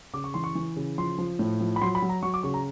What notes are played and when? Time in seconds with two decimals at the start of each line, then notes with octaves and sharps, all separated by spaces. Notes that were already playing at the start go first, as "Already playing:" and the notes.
0.14 C#3 D6
0.24 C#6
0.34 E3 C6
0.44 C#6
0.55 E3
0.76 C#3
0.98 F3 C6
1.18 F3
1.39 A2
1.61 F3
1.76 B5
1.82 F#3 C6
1.95 B5
2.02 F#3
2.09 A#5
2.23 F#3 C#6
2.34 D6
2.43 C#3 C#6
2.54 A#5